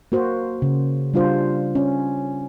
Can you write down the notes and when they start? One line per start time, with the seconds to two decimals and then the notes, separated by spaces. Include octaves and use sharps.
0.12 A#3 F#4 C5
0.62 C#3
1.14 G3 D4 F4 C5
1.75 C#4